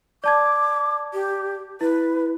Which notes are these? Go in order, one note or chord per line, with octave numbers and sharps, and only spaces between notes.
D5 A5 D6 G#6
G4
E4 B4